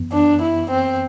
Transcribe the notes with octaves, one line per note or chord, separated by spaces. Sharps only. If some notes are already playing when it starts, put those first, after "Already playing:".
Already playing: F#2 E3 B3
D4
E4
C4